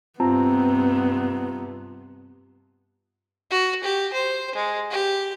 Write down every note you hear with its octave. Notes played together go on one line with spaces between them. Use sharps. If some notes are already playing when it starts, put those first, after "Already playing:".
G2 C3 B3 C4 F4 A5 A#5
F#4
G4
C5
G#3
G4